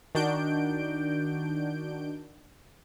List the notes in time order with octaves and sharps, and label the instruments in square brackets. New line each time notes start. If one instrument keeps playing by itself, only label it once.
[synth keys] D#3 D4 F#4 G6 D7